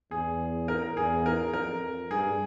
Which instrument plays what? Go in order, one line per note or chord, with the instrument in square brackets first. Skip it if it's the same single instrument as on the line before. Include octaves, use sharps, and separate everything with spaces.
[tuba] E2 [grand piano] G#4
[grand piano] A#4
A#4
[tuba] E2 [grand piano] G#4
[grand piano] A#4
[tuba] F2 [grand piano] A#4
[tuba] G2 [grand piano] G#4